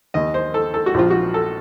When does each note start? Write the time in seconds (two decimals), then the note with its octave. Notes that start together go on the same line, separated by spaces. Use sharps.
0.14 D#2 D#3 D#5
0.34 C5
0.54 A4
0.74 A4
0.86 F#4
0.94 A#1 A#2 F3 F4
1.10 F#4
1.34 A4